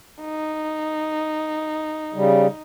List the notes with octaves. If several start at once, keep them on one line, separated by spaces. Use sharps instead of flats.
D#4
C#3 G3